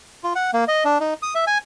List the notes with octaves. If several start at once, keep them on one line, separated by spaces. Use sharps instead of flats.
F4
F#5
A#3
D#5
D4
D#4
D#6
E5
G#5